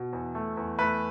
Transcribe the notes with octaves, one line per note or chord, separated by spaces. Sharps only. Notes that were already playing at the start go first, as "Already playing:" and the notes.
Already playing: B2
E2
A3
E2
A3 B4